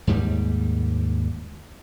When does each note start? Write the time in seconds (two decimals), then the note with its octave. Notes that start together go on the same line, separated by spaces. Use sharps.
0.07 D#2 G#2 G3